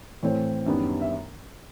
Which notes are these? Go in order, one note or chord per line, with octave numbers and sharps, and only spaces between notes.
A2 E3 A3 C4 C#5
F#2 D#3 G3 B3 D4
E5